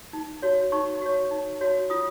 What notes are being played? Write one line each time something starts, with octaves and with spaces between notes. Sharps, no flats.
D#4
F#4 C#5
D#4 C#6
F#4 C#5
D#4
F#4 C#5
F4 D#6